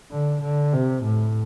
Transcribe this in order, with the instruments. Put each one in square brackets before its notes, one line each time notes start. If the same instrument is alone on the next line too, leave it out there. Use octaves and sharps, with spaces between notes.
[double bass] D3
D3
C3
A2